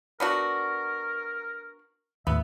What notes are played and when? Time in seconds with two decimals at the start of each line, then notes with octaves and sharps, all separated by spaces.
0.20 B3 D4 F#4 A#4
2.27 D#2 A2 B3 E5